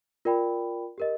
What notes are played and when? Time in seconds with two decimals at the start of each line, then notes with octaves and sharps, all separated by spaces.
0.25 F4 A#4 D5 G5 B5
0.98 G4 A#4 D#5